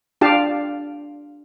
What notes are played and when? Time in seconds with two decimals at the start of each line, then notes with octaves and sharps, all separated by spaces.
0.21 D4 F4 G4 F5 A5